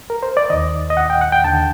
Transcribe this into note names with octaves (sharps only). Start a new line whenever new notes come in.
A#4
C5
D5
D#2 D#3 D#5
D#5
F#5
G5
F#5
G5
D#2 D3 A5